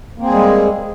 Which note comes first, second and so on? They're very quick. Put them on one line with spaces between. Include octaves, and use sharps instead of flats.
A#3 C4 G#4 G3 G#3